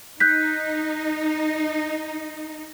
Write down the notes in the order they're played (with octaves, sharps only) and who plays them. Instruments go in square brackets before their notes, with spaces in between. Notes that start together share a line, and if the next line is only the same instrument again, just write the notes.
[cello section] D#4 [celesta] F#6 G6 B6